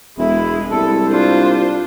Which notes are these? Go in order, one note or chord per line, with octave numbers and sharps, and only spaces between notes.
E1 G#3 E4
C2 A4
D4 F4 C5